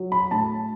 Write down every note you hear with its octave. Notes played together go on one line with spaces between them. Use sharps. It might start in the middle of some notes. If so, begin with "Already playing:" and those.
Already playing: F#3
B5
A2 A5